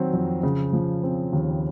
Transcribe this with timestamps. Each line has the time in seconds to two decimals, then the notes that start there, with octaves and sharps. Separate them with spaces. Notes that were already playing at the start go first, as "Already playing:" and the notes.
Already playing: D#3 F#3 C4
0.13 F2
0.43 C#3
0.73 F3
1.03 C4
1.33 D#2